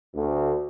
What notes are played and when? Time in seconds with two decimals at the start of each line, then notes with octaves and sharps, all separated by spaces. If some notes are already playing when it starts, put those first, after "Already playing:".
0.14 D2